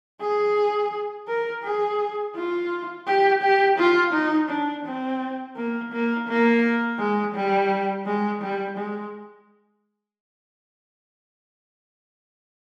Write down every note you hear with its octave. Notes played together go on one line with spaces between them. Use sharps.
G#4
A#4
G#4
F4
G4
G4
F4
D#4
D4
C4
A#3
A#3
A#3
G#3
G3
G#3
G3
G#3